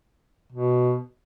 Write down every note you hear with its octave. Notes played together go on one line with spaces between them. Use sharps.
B2